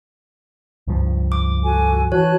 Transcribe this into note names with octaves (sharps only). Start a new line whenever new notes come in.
C#2 G2 F3
D6
F#4 A4 G#5
E3 F#4 C#5 A5 F#6